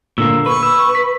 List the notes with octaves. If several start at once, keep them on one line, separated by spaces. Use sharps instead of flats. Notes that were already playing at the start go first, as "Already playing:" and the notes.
A#2 D3 A#3 E6
B4 C#6
E6
B6